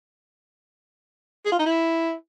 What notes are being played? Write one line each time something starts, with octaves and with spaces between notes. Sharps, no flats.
G#4
F4
D#4
E4